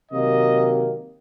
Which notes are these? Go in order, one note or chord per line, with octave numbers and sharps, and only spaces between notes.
C3 D#3 F#3 A#3 D#5